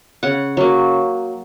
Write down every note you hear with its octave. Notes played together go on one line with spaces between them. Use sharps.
C#3 F#5
F#3 A#3